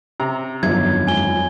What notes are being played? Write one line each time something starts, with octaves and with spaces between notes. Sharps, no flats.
C3 A#5
G1 F2 D#3 F3 F#3 G#6
G#2 G#5 G7